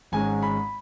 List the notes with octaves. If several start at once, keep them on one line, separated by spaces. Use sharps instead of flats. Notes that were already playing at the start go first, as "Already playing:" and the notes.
G#1 G#2 G#3 C#4 G#5
B5